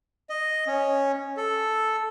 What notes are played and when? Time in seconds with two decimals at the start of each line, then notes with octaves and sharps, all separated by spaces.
0.30 D#5
0.67 C#4
1.37 A4